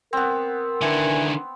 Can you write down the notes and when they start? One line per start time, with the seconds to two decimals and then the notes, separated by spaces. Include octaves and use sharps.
0.13 B3 C4 A#4
0.81 D3 D#3 E4 B4 G#5